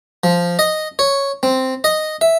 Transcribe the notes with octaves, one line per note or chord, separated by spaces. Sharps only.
F3
D#5
C#5
C4
D#5
E5